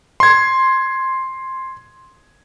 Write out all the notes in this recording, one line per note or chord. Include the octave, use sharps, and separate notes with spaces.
C6 G#6